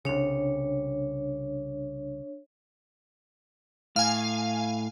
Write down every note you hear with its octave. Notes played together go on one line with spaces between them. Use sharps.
C2 C#3 D4 C#5
A2 F5 G#5